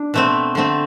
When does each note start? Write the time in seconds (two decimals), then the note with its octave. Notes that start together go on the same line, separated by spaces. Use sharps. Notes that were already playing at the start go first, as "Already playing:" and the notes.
Already playing: D4
0.14 B2 A3 C4
0.55 D3 A3 C4